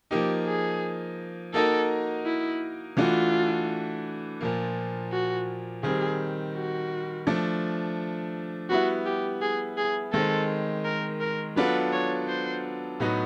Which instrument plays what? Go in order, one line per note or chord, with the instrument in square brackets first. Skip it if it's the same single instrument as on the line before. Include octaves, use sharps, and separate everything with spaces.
[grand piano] F3 A#3 D#4 [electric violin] G4
[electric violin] G#4
[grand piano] A#3 D#4 F#4 A#4 [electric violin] A4
[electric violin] E4
[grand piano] E3 A3 D4 F#4 [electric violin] F4
[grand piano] A#2 F3 A#3
[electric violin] F#4
[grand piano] D#3 G3 C4 [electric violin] G#4
[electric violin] F#4
[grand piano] F3 A3 D4
[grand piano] G3 B3 E4 [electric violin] F#4
[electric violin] G4
G#4
G#4
[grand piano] D#3 G#3 C4 [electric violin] A4
[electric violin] A#4
A#4
[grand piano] F#3 B3 D4 F4 A4 [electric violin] B4
[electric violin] C#5
C5
[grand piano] A2 F#3 B3 D#4 F#4